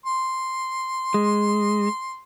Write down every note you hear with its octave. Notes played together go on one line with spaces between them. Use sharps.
C6
G#3